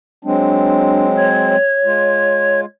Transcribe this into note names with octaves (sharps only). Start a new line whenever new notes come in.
F#3 G#3 C4 D4
C#5 G#6
G#3 F4